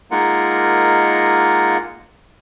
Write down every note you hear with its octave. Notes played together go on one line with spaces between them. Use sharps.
G#3 A#3 D#4 F4 A#4 F#5